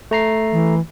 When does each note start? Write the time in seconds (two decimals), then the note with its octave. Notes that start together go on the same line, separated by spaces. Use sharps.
0.11 A3 A#5 C7
0.52 E3